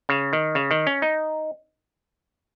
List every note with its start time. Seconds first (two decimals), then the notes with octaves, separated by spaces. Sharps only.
0.09 C#3
0.33 D#3
0.55 C#3
0.71 D#3
0.87 C#4
1.02 D#4